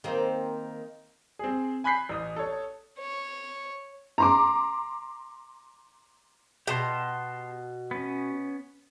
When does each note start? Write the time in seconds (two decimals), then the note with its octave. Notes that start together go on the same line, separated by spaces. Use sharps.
0.04 D#3 A#3 C4
1.39 C4 G#4
1.84 G#5 B5 F#6 G6 B6 C7
2.09 A1 D#6
2.36 A4 C#5
2.99 C#5
4.18 A#5 C6 D6
6.67 B2 G4 A5 C6
7.91 B3 C#4